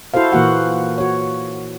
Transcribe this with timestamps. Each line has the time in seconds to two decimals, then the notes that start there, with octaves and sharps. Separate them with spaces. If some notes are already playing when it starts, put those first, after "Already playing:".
0.14 E4 F#4 A4 C5 F5
0.32 A#2 E3 A#3 F#4 F#5
0.98 F#4 C#5